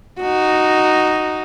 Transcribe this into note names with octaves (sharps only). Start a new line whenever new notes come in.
D#4 F#4